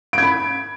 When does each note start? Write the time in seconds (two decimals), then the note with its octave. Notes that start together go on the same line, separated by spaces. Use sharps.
0.13 D7
0.18 G#6
0.23 B5